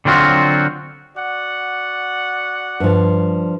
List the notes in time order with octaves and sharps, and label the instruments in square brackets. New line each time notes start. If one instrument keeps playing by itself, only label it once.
[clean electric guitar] D3 F#3 C4 F4 F#4
[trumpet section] F#4 D5 F#5
[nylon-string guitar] G2 F3